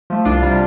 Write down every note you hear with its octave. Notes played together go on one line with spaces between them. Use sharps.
F3 A3
C2 D4 F4
C3 G3